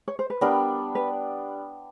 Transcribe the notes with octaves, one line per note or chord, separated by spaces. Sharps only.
C#5
C5
B4
G3 B3 D4 A#4
B4